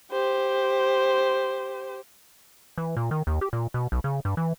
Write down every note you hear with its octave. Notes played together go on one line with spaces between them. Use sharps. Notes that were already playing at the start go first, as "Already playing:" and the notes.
G4 C5
E3
A#2
D#3
D#2
G4
A#2
B2
B1
C#3
G2
E3